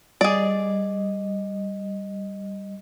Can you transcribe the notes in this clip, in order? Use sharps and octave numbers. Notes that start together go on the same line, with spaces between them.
G3 G#4 D5 D#5